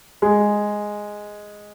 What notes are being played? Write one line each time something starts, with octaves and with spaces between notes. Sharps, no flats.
G#3